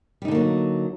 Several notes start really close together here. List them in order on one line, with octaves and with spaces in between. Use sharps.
G3 D#4 D3 A#3 F#3